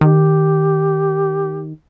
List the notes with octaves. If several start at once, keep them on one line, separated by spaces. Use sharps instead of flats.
D#3 G4